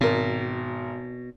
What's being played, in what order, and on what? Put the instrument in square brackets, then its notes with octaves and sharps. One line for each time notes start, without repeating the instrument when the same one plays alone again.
[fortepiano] G#1 A#4 [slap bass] B2